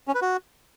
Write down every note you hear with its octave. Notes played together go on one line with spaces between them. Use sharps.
C#4
B4
F#4